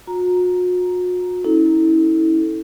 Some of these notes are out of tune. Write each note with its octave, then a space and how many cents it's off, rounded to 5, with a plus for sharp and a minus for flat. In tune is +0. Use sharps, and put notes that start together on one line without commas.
F#4 -40 A#5 +0
C#4 +0 E4 -30 A4 +0